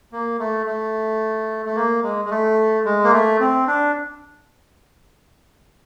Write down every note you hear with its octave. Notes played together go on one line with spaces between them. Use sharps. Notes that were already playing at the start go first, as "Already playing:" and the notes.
A#3
A3
A3
A3
A#3
G#3
G#3
A3
G#3
A#3
A3
C4
D4